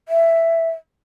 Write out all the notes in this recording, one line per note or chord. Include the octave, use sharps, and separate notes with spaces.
E5